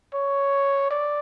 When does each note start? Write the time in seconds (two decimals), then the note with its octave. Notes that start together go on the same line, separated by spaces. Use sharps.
0.14 C#5
0.91 D5